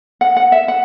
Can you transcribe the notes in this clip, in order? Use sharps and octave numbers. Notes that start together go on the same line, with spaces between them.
F#5
F#5
E5
F#5